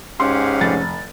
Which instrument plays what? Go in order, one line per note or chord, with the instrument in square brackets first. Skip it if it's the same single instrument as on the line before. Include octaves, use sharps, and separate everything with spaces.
[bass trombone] G#2 [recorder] C#4 [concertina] G4 F5 F#5 [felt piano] C6
[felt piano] F1 A6